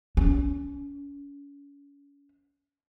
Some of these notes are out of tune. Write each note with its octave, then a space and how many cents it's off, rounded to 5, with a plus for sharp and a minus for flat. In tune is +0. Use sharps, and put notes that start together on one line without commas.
C#4 +35